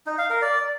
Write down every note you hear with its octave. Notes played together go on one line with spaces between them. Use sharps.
D#4
F5
A#4
D5